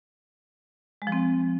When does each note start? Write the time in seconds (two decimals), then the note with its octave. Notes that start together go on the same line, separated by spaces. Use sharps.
1.02 G#3
1.07 F3
1.12 C4